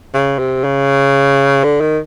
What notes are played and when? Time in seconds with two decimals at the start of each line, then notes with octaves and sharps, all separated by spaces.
0.14 C#3
0.39 C3
0.64 C#3
1.64 D3
1.81 D#3